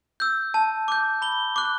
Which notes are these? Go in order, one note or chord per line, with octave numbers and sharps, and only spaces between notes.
E6 G6
A5
D6 G6
B5 G7
D6 F#6